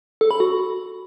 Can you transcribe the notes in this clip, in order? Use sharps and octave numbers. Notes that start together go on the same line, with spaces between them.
A4
B5
F#4